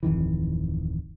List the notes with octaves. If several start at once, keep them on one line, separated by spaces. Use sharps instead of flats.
D1 F2 D#3 E3